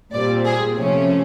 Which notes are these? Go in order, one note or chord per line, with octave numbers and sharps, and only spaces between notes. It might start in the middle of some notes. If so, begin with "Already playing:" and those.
A#2 G3 C4 D5
G#4
C3 F3 A3 C#4